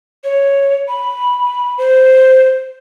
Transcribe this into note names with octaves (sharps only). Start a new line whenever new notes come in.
C#5
B5
C5